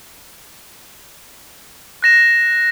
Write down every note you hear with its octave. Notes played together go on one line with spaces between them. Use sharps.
F#6 A#6 E7